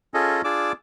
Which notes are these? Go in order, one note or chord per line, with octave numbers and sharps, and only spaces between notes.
C#4 F4 G#4 A4 D#5
D4 F4 G#4 D5 D6 E6